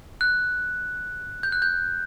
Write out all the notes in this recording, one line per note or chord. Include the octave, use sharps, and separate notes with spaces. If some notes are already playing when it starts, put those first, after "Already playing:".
F#6
G6
F#6
G6